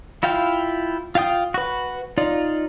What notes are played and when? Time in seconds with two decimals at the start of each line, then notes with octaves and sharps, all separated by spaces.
0.23 E4 F4 F5 G5
1.15 F4 F5 G5 D#6
1.54 F#4 B4
2.18 D#4 F4 D5